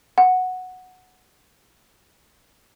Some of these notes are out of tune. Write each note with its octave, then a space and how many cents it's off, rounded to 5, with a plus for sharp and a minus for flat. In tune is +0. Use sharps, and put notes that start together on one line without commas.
F#5 -5